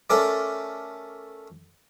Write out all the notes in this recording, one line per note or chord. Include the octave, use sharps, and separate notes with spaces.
A3 C#4 A4 A#4 D5